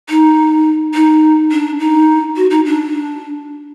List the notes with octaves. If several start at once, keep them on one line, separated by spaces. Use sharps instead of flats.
D#4
D#4
D4
D#4
F#4
D#4
D4